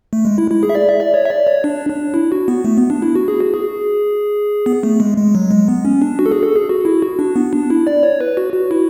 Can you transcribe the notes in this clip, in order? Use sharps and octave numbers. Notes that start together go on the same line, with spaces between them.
A3
G#3
E4
E4
G#4
E5
D5
E5
D5
C#5
E5
D5
C#5
D4
D4
E4
F#4
B3
A3
B3
D4
E4
F#4
G#4
F#4
G#4
B3
A3
G#3
G#3
F#3
G#3
B3
C#4
D4
F#4
A4
G#4
A4
G#4
F#4
E4
F#4
D4
B3
D4
E4
D5
C#5
B4
F#4
F#4
E4